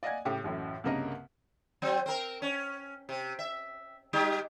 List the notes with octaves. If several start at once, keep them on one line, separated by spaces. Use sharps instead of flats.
D5 D#5 F5 F#5 G#5 G#6
A2 C#3 G4
A1 F#2 A2
C2 G2 C#3 A#3 A#4 D#5
F#3 C4
C4 A#4
C#4
C3
E5
G3 D#4 G4